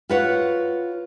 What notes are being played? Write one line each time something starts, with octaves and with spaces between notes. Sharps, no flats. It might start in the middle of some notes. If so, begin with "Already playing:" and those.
F4 F#4 B4 C#5 F#5